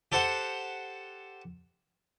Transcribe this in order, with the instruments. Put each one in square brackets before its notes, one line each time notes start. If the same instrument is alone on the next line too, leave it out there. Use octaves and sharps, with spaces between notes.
[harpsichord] G4 A4 C5 F#5